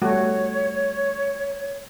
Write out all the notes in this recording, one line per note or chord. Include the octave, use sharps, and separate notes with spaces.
G3 A3 F#4 C#5